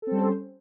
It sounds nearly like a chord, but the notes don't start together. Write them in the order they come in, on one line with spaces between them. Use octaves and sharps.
A4 C4 G3 C#4 C5